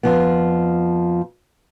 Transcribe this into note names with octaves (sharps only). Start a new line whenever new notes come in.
F2 F3 B3